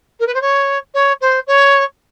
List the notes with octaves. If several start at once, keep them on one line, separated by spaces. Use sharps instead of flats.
A#4
B4
C5
C#5
C#5
C5
C#5